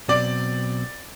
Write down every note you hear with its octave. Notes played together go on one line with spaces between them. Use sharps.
B2 F#3 C4 D5